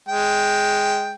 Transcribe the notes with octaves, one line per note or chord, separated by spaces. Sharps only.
G#3 G5